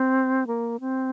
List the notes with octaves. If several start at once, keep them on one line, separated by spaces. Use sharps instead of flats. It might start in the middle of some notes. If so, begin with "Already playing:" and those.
Already playing: C4
A#3
C4